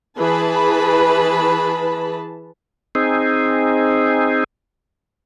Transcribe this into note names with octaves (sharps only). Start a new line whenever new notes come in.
E3 G#4 B4 A5 B5
C4 D#4 G#4